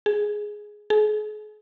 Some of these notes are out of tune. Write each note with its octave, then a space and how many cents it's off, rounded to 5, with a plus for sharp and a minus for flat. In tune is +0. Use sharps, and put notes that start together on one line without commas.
G#4 +5
G#4 +40